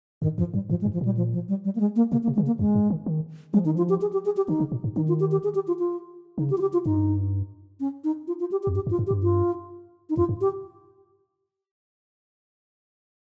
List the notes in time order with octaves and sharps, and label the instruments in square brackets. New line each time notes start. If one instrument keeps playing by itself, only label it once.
[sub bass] G2 [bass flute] D#3
[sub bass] F2 [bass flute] F3
[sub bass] G2 [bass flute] G3
[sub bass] G#2 [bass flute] F3
[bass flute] G#3
[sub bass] G2
[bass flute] F3
[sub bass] A#2 [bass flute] G3
[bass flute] F3
F3
G3
G3
A#3
G#3
A#3
[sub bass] C3 [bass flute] A#3
[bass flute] A#3
[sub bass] C3
[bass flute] G#3
[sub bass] D#3
C#3
[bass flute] A#3
[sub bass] F2 [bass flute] G#3
[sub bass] G2
D#3
D#3
[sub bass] F3 [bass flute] G#3
[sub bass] D#3 [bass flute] D#4
[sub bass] F3 [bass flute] F4
[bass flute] G4
G#4
G4
G#4
G4
[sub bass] D#3 [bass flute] D#4
[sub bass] C#3
A#2
G#2
[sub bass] D#3 [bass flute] D#4
[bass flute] F4
G4
G4
G#4
G4
F4
F4
[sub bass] C#3 [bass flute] D#4
[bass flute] G4
F4
G4
F4
[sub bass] G2 [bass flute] D#4
[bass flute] C#4
D#4
F4
F4
G4
G4
[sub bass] F2
[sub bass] G2 [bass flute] G4
[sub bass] G2
[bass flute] F4
[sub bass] G2
[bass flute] G4
[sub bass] G2
[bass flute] F4
D#4
[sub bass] F2 [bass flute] F4
[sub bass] G2
[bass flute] G4